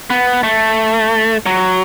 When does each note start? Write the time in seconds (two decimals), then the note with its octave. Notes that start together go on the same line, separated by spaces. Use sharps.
0.10 B3
0.43 A3
1.46 F#3